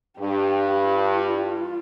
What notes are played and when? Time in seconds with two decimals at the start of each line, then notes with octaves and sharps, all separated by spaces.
0.19 G2 G4
0.94 F4